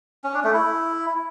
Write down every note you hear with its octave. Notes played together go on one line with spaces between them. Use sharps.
C#4
D4
A3
E4